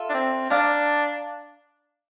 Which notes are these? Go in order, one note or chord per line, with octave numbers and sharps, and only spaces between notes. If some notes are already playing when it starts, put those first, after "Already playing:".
Already playing: F4 A4 E5
D4
C4
D4 D5 F5 A#5 D6